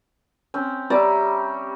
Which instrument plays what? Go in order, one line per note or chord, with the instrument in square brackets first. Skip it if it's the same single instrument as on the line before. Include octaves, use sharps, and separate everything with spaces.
[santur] C4 [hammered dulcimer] C#4
[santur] G3 [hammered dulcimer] C#5 E5 A#5 [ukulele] D5